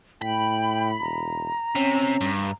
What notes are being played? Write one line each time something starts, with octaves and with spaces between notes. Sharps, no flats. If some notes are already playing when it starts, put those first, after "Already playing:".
A2 G5 B5
E1 A#5
C3 C#4
G2